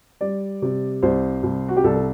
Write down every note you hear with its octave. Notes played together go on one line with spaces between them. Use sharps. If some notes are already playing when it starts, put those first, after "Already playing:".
G3 D5
C3
C2 C5
C2
F#4
G4
C2 A4
A4